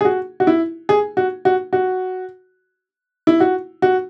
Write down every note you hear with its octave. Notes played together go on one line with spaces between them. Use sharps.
G#4
F#4
F#4
E4
G#4
F#4
F#4
F#4
E4
F#4
F#4